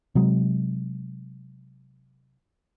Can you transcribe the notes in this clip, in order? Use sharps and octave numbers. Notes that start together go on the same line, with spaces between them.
C3 F#3 G#3